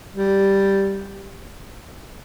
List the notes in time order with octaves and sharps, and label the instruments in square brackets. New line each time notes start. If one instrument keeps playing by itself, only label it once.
[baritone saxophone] G3